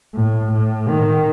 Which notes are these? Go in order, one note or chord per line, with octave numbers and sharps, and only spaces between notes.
A2
A2
D#3